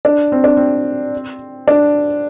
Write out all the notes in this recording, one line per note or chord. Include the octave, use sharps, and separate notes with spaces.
D4
C4
D4
C4
D4